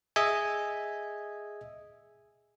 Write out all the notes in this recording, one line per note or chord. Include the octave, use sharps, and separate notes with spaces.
G#4 D#5 E5 G#5